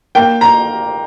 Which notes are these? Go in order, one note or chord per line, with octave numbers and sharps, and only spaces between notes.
A#3 G5
A#5